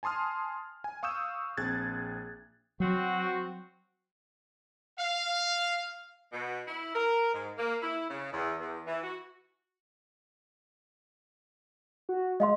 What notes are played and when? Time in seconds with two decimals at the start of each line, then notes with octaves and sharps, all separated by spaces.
0.03 G#5 A5 C6 D#6 F6
0.84 G#5
1.03 F5 C#6 D#6 E6 G6 E7
1.57 A#1 C4 G#4 F#6 G#6 A6
2.80 F#3 C4 F#4
4.98 F5
6.32 B2
6.68 E4
6.95 A#4
7.34 G#2
7.59 A#3
7.82 E4
8.10 C#3
8.33 E2
8.60 E2
8.86 E3
9.03 F#4
12.09 F#4
12.40 G#3 D#5 F5 C6